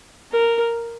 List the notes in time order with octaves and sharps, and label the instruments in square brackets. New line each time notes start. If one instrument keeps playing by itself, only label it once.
[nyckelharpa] A#4